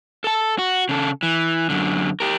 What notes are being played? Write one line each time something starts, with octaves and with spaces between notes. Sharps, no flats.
A4 A5
F#4
C#3 A4
E3
F#2 D3
G4 A#4